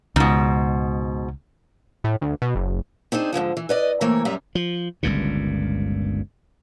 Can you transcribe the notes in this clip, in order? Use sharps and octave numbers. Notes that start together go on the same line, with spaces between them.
C#2 G#2 B2
A2
D2
B2
F#1
C4 D4 D#4 G#4
G#2 D3 E3 F3
E3
B4 D5 D#5
C3 E3 A3 A#3 C#5
F#2 G3 B3 E5 A#5
F3
G1 C#2 G2 A#2